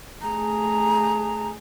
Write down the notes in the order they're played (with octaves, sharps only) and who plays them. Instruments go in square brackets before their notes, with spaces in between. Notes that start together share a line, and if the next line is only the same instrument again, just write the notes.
[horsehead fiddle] A3 G#4 [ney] A#5